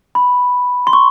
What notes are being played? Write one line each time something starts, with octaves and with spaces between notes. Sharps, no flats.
B5
C6
C#6